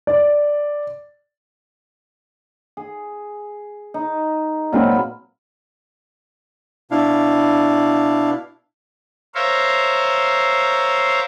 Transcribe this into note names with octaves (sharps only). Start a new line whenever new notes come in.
D5
G#4
D#4
A#2 F#3 G#3 C4 F4 B4
B2 D4 E4 F5
A#4 C5 C#5 E5 F5